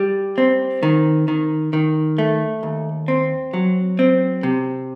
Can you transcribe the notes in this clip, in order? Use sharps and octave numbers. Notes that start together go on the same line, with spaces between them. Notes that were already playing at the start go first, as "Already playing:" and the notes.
Already playing: G3
C4
D#3
D#3
D#3
A3
D#2
C4
F#3
C4
C3